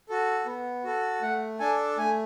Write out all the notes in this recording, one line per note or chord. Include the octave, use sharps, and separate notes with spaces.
F#4 A4
B3
F#4 A4
A3 F#5
D4 A4 G#5
A3 G#5